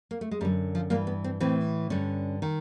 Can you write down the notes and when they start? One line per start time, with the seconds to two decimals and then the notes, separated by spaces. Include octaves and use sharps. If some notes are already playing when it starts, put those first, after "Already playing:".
0.11 A#3
0.21 A3
0.31 G#3
0.41 F#2 G3
0.45 D3
0.75 F3
0.90 G2 E3 A#3
1.07 B3
1.24 C4
1.40 A2 E3 C4
1.90 G2 D3 C#4
2.42 D#3